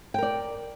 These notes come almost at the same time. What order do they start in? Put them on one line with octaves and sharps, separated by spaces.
G5 A#4 D5